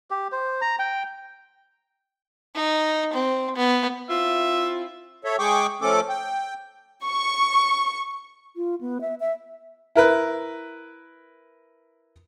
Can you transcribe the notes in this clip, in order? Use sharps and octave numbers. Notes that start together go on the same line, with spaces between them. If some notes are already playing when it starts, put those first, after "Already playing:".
G4
C5
A#5
G5
D#4
C4
B3
C4 E4 F4 E5
A4 C#5 E5
G#3 G#4 G5 C#6 D6
F3 A3 C#4 A4 D6
G5
C#6
F4
B3
E5
E5
E4 A#4 B4